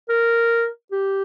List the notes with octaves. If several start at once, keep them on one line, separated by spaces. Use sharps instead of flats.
A#4
G4